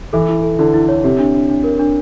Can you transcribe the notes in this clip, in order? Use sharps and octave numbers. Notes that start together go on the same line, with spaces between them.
E3 A4
E4
A4
D3 E4
E4
C#5
C3 G4
D4
D4
D4
A#4
D4